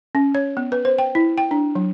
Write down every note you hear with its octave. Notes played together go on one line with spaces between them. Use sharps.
C#4
C#5
B3
B4
C5
G5
E4
G5
D4
F#3